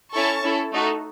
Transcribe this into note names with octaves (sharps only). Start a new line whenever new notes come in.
C#4 E4 A4 A5 C#6
C#4 E4 A4
A3 D#4 F#4 A4